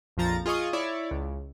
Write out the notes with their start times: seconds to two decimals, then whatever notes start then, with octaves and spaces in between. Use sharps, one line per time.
0.17 A#1 F2 F3 A#5 A6
0.46 F4 G#4 D#5 C#6 D#6
0.73 E4 C#5 D5
1.11 C#2